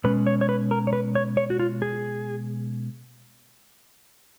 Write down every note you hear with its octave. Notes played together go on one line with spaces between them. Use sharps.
B2 G#3 C#4 B4
C#5
C#5
B4
A#4
C#5
B4
C#5
C#5
F#4
F4
G#4